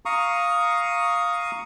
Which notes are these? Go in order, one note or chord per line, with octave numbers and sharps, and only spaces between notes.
F5 A#5 C#6 D#6